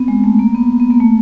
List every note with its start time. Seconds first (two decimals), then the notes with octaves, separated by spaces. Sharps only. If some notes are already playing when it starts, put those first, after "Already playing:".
Already playing: B3 C4
0.08 G#3
0.24 A3
0.39 A#3
0.55 B3
0.80 B3
0.90 A#3
1.00 A3